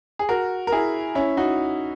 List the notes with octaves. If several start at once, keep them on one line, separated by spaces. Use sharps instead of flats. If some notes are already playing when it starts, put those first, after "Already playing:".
G#4
F#4 A#4
A#4
E4 G#4
C#4 E4
D#4 F#4